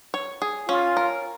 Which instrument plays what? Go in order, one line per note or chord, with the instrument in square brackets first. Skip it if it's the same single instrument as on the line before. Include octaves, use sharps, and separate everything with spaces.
[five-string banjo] C#5
G#4
[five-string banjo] C#4 [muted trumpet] F4
[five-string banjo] A#4